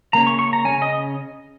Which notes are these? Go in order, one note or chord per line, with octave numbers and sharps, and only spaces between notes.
C#3 A#3 C#4 A#5
C#6
C#6
A#5
C#3 A#3 C#4 G#5
D#5